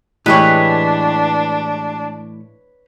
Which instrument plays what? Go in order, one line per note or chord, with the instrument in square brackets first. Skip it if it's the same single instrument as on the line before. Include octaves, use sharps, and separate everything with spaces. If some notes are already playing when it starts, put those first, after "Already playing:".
[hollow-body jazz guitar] A2 E3 [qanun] G#3 G4 [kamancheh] D4 [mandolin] B4 C#5